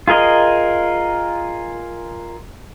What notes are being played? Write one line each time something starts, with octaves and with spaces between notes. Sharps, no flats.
F4 G#4 A#4 D#5